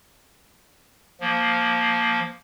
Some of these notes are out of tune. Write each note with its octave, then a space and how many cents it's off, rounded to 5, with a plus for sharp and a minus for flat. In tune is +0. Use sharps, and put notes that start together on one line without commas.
F3 +0 A#3 +0